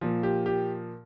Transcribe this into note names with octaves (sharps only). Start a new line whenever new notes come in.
A#2 F3
G4
G4